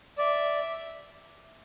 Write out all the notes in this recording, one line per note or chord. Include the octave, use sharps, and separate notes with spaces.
D5 E5